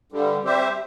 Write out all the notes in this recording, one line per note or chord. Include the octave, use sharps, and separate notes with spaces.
G2 D3 G3
G3 C4 G4 C5 E5